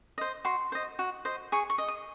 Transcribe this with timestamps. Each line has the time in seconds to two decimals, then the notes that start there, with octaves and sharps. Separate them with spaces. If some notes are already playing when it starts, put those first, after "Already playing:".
0.18 C5 D#5
0.45 F#4 C6
0.72 C5 D#5
0.99 F#4
1.25 C5 D#5
1.52 G#4 C#6
1.70 C#6
1.78 D#5
1.88 D#6